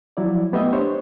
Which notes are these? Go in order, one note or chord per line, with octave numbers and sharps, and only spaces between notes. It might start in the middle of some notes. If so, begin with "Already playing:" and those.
F3 F#3 E4 D5
A3 B3 G4 D#5 E5
D4 C5 C#5